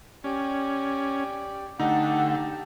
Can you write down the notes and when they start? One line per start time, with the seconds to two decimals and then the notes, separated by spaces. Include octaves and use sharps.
0.24 C#4 G4 D5
1.80 D3 A3 D#4 G4 F#5 A5